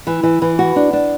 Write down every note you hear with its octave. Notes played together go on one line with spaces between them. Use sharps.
E3
E3
E3
F#4
D4
D4